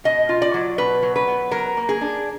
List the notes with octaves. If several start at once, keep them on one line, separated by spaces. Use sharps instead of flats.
B2 D#5
F4
D5
F#3
B2 B4
F#3
B4
B3
F#3 A#4
A#3
G#4
D4